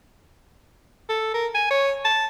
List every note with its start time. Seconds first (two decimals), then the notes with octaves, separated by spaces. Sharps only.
1.09 A4
1.34 A#4
1.55 G#5
1.71 C#5
2.05 A5